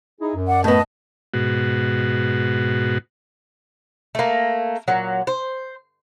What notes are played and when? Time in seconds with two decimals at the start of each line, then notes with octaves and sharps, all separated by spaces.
0.21 D#4 E4 G#4
0.35 F#2
0.47 D5 F#5
0.64 A2 B3 D#5 A5
1.34 G#2 B2 F#4
4.15 A3 A#3
4.88 A#2 F#3
5.27 C5